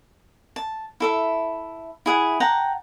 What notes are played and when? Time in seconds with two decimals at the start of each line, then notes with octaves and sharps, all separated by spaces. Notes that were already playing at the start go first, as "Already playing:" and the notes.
0.56 A5
1.00 E4 A4 E5
2.06 E4 G#4 F#5
2.40 F#5 G5 A5 A#5